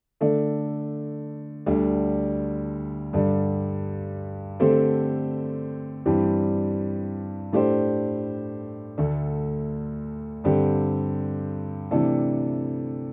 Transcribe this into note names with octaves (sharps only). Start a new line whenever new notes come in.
D3 A3 D4
D2 D3 G3 D4
G2 D3 G3 D4
D3 A3 C4 G4 C5
G2 E3 G3 C4 G4
A2 A3 D4 G4 C5
D2 D3 A3
G2 D3 C4 G4
C3 E3 A3 D4 A4